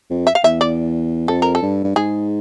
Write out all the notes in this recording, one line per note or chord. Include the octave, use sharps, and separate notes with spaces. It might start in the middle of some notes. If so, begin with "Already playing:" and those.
F2
E5
F5
E2 E5
D5
F2 A4
A#4
A4
G2
G2
G#2 G#4